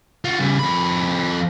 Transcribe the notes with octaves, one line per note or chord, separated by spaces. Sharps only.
F4 F#4
C#3 G3
F2 B5